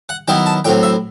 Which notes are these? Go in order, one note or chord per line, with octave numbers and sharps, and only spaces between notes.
F#5
D#3 F#3 B3 E4 G5
A5
A2 F#3 C4 G5
E5